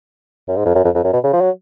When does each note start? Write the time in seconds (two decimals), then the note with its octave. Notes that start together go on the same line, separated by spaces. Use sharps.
0.48 F#2
0.56 G#2
0.65 F2
0.75 F#2
0.85 F2
0.95 F2
1.04 F#2
1.13 B2
1.24 C#3
1.33 F3
1.41 F#3